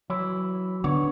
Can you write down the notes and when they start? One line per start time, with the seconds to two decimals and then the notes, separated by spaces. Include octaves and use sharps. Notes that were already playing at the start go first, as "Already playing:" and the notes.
0.10 E3 F#3 E4
0.84 D3 B3 C#5